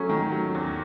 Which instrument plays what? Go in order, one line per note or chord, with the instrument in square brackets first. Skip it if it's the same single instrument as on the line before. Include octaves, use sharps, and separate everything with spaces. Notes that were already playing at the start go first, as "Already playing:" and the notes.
Already playing: [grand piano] F#3 [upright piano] A3 C#4
[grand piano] D#3
F#3
E2